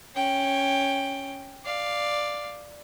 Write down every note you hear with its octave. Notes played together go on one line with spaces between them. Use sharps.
C#4 G5
D5 F5